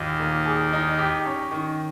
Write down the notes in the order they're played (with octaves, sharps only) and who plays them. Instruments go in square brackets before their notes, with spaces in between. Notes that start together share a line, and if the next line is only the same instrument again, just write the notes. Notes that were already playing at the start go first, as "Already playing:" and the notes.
Already playing: [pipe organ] D#2 D#3 [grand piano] A#2 D#4
[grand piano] A#3
G#4
D#4
G4
C#4
D#3